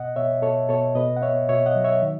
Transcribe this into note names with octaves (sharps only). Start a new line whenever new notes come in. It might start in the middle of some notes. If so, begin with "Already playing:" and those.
Already playing: B2 D#5 F#5
B2 C#5 E5
B2 A4 C#5
B2 A4 C#5
B2 B4 D#5
F#5
B3 C#5 E5
B2 C#5 E5
D#5 F#5
F#3
C#5 E5
D#3